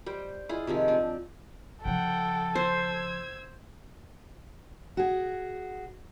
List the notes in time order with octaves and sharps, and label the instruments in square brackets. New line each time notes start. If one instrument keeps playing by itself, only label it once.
[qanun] G3 C5 G5
E4 F4 G#4
C3 D#3 F3 G#3
C4 D4
[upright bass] C#3 F3 [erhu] A4 [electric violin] F#5 G5
[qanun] C5 [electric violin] E6 G#6
[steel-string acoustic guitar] F#4 G#4